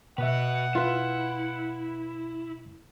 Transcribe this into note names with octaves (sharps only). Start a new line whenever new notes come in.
B2 F#4 B4 E5 F#5
E4 F4 B4